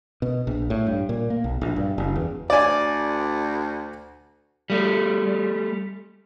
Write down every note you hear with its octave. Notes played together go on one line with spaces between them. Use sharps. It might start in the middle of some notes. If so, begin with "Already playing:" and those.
B2
A#1
A2
G2
A#2
A#3
B1
A#1
G2
F#1
E2
D2 D5 G#5
G3 A3